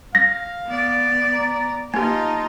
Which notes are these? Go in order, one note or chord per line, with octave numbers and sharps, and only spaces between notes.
F5 A#6
B3 D5
A#5
A#3 D#4 F4 G4 A5